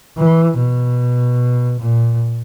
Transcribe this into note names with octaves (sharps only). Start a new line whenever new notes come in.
E3
B2
A#2